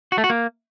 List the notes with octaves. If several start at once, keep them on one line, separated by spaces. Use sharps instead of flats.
F#4
A3
F#4
A#3